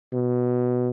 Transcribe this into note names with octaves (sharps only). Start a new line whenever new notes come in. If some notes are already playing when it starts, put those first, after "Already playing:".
B2